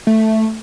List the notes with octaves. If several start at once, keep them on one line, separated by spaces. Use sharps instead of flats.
A3